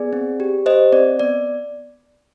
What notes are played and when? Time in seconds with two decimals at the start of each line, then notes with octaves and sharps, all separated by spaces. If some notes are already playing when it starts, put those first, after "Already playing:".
Already playing: B3 G#4 D5
0.13 C4
0.40 G4
0.66 G4 C5 D#5
0.93 C4 D5
1.19 B3 D5